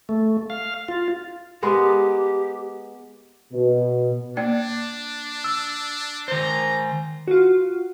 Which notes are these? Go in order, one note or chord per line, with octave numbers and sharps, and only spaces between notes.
A3
F5
F4
G#3 B3 G4 A#4
B2
A#3 D4 D5
E6
D#3 C5 A#5
F4 F#4